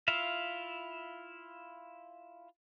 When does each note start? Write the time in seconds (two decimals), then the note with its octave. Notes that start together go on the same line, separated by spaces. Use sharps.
0.08 E4 F4 E5 F5